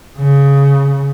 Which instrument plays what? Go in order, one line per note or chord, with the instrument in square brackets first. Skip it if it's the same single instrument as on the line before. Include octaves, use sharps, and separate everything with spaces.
[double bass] C#3